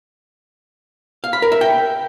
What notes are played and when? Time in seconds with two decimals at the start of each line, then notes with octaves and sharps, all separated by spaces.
1.24 F5
1.33 B5
1.42 A#4
1.52 E5
1.61 G5